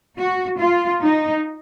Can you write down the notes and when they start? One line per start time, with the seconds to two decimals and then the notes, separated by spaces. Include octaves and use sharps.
0.18 F#4
0.59 F4
1.02 D#4